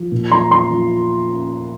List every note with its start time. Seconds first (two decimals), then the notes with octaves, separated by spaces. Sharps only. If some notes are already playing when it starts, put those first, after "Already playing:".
Already playing: F3
0.12 A#2
0.32 F3 A#5 C6
0.51 F3 A#5 C6
0.71 F3